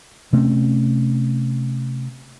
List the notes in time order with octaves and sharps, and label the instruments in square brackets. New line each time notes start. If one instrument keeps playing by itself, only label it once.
[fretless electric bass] C3 A3 C4 C#4